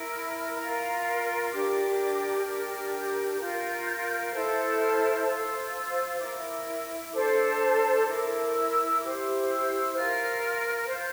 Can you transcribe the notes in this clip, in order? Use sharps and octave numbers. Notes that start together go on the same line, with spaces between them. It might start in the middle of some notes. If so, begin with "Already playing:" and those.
Already playing: E4 A#4
F6
F4 A#4 A#5
C6
D4 G4 A#4 D6
D4 G4 A#4 F6
G6
F4 A#4 G6
E4 A4 C5 G6
F6
F4 C5 E6
E4 A#4 D6
D4 A4 C5 D6
C6
E4 A#4 D6
E6
E4 G4 C5 D6
E6
F4 A#4 F6
F4 C5 G6